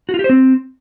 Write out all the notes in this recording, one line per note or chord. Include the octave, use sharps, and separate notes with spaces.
F#4
F4
G4
C5
C4